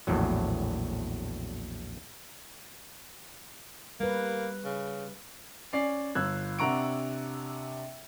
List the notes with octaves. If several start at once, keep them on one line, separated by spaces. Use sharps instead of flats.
A#1 E2 A2 F#3
G3 A#3 B4
C#3
C#4 D5 C7
G1 E6 F#6 G#6
C3 D4 F#5 A#5 C#6 D7